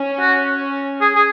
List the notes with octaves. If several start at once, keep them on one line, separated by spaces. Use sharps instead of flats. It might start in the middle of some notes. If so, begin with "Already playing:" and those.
Already playing: C#4
F#4
G#4
G#4